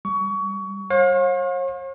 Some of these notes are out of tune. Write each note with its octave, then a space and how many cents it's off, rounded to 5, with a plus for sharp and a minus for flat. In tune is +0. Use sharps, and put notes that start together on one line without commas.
G3 +0 C#6 +25
C#5 -45 F5 +35